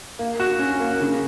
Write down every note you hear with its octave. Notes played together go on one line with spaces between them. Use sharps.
A#3
F#4
C#4
A#3
C#3